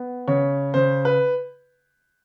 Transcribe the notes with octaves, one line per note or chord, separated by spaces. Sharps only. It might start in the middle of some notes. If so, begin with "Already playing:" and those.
Already playing: B3
C#3 C#5
C#3 C5
B4